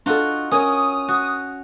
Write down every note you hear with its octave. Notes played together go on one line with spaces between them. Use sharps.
D4 F4 F#4 A4 D#5
C#4 A#4 C#5 D#6
F#4